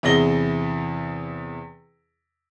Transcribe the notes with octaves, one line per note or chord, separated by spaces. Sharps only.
E2 C3 E4 G#4 A#6 G7